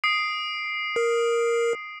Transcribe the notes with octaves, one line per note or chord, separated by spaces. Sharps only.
D#6 C7 D7
A#4